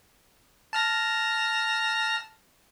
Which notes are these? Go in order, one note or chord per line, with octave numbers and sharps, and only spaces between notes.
A5 F6 A#6